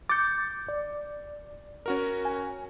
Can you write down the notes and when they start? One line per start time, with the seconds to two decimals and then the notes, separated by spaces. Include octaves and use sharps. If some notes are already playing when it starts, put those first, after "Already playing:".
0.09 D6 G6 A6 C#7
0.69 D5
1.86 C#4 F#4 A#4
2.25 G#5